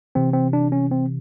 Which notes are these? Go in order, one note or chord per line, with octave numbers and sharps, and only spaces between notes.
C3 E3 C4
C4
D4
C#4
C4